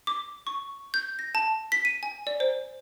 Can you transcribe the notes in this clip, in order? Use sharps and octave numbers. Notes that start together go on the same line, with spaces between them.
D6
C#6
G6
A#6
A5
B6
D#7
G#5
D5
C5